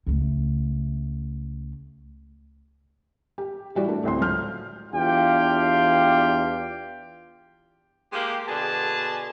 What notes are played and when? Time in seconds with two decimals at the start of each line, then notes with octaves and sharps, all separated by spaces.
0.07 C#2 A3
3.38 G4
3.75 E3 G3 F#4 D5
3.88 A3 D4
4.03 A1 D2 C4 C6
4.19 C#2 F#3 F6 G6
4.92 E2 D4 F4 G4 F5 G5
8.13 G#3 A#3 G4
8.48 B2 D3 G#4 A5